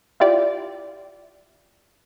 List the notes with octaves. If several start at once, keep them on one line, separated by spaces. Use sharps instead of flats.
E4 F4 G4 D5